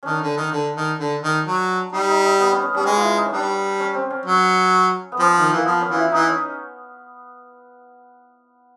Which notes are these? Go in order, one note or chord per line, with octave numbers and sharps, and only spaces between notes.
D#3 C#4 D4
D3
D#3
D3
D#3
D3
D#3
F#3
G3 D#4
D#4
D#4
B3
C#4
C#4
G3 C#4
G#3 B3
E4 F4
D#4
C#4
G3 D4
C#4
C4
C#4
F#3
B3
F3 C4
D#3
E3 A#3
F3 B3
C#4
E3 F4
E4
E3 D#4
C#4